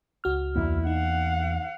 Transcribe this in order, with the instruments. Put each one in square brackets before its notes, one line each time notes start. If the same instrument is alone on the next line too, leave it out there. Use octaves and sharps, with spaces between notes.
[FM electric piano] C#2 F#4 F6
[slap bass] E2 A#3 [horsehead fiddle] E4
[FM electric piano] D#4 [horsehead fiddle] F5 F#5